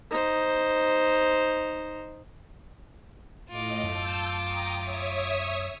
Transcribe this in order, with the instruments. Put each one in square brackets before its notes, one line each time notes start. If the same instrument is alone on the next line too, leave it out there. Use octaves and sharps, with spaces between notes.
[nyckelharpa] D#4 C5
[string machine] A2 D#5 [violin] F4 D6
[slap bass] F#2 A3 [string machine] A5 E6 G6
[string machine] G5 A#5 D#6
C#5 E5 D#6